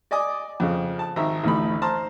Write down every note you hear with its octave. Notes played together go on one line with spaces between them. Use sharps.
D5 D#5 G#5 D6 D#6
F2 C#3
A5
G#1 E5 A#5
A1 D2 A3 D#4 B5
C5 A5 A#5 C6 F6